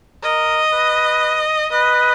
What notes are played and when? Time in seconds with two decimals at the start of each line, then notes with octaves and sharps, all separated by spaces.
0.23 A#4 D#5
0.72 B4
1.72 B4 D#5